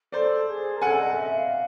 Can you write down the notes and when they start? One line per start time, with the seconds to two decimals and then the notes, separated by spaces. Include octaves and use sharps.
0.12 A4 C5 D5
0.47 G#4
0.76 A#4
0.82 A4 F#5 G#5
0.99 D#5
1.16 E5
1.33 F5